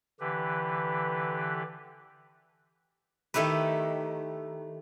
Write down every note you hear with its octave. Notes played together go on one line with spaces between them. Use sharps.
D3 E3 G4 B4
D#3 A3 E4 G4 B4